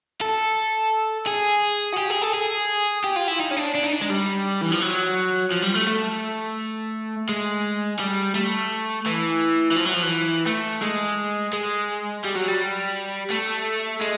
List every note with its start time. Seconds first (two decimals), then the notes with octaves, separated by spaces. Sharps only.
0.21 A4
1.27 G#4
1.93 F#4
1.98 G4
2.10 G#4
2.22 A4
2.34 G#4
3.04 G4
3.16 F4
3.28 E4
3.40 D#4
3.51 C#4
3.57 D4
3.75 D4
3.84 D#4
3.93 D4
4.02 G#3
4.10 G3
4.62 E3
4.72 F3
4.81 F#3
5.52 F3
5.64 G3
5.75 A3
5.87 A3
7.29 G#3
7.99 G3
8.35 A3
9.06 E3
9.71 E3
9.76 F3
9.86 F#3
9.94 F3
10.03 E3
10.47 A3
10.82 G#3
11.53 G#3
12.25 G3
12.36 F#3
12.48 G3
13.30 A3
14.01 G#3